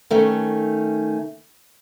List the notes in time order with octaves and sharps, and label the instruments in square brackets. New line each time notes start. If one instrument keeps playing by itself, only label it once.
[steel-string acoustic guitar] D#3 A3 C#4